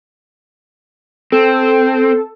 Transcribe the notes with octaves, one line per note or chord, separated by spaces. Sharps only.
C4 A4